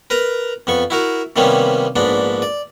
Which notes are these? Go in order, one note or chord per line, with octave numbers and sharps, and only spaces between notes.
A#4 B4 A#5
F2 B3 C#6
E4 F#4 A#4
C3 D#3 G3 A#3 B3 C#4
A#1 G#2 B3 D4
D5